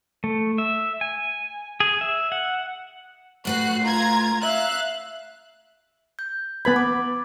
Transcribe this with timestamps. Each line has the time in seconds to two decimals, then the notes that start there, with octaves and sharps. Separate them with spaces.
0.24 A3
0.58 E5
1.01 G#5
1.80 G#4
2.01 E5
2.32 F#5
3.45 A2 A3 F#4 B4 F#6 C7
3.83 F4 A#5 G#6
4.42 E5 F5 F#6
6.19 G6
6.65 B3 B4 B5 G#6 A6
6.76 D6